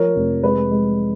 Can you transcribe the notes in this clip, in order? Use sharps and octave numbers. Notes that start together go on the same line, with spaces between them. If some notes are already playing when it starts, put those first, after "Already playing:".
Already playing: F3 A#4 C#5
F1
G#3 B4
G#3